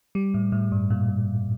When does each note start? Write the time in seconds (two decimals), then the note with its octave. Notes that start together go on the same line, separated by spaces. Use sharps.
0.15 G3
0.34 A2
0.52 A2
0.72 G2
0.90 A#2